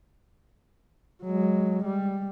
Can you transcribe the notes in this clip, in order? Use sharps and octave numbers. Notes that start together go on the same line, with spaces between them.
F#3 G#3
G3